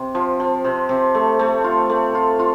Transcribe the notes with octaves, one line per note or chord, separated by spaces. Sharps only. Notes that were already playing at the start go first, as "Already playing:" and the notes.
Already playing: C3
F3
F3
C3
C3
A3
A3
F4
A3
F4
F4